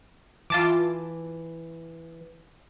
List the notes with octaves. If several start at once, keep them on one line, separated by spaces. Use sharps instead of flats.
E3 F4 A5 D6